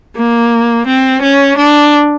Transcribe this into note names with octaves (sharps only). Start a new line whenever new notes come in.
A#3
C4
C#4
D4